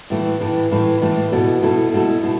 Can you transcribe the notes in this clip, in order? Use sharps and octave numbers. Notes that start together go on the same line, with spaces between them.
A2 E3 A3
A2 E3 A3
A2 E3 A3
A2 E3 A3
B2 A3 E4 A4
B2 A3 E4 A4
B2 A3 E4 A4
B2 A3 E4